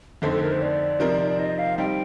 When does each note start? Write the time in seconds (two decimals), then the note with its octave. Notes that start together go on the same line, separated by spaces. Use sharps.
0.22 F2 D3 A3 C4 D#4 A4
0.32 A4
0.42 A#4
0.52 C5
0.62 D5
1.00 C3 F3 C4 D#4 A#4
1.39 D#5
1.59 F5
1.78 G3 C4 D#4 G5